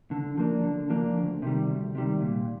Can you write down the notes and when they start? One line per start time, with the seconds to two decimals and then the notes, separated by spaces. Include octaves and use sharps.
0.11 D3
0.37 F3 A#3 D4
0.63 D3
0.90 F3 A#3 D4
1.16 D2
1.42 C3 D#3 G3
1.69 D2
1.95 C3 D#3 G3
2.21 A#2